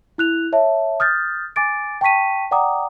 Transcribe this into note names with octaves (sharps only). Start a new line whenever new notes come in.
E4 F#6 F7
C#5 E5 A5
D#6 F6 G6 A6
G#5 D6 A6 D7
G5 A5 C#6 B6 D#7
D5 F#5 G5 A#5 D6 D#6